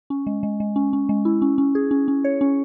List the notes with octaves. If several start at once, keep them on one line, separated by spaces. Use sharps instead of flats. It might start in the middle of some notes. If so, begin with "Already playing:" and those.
C#4
G#3
G#3
G#3
C#4
C#4
G#3
E4
C#4
C#4
G#4
C#4
C#4
C#5
C#4